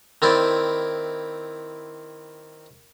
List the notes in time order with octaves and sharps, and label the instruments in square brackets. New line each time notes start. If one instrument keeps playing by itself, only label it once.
[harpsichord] D#3 C4 E4 D5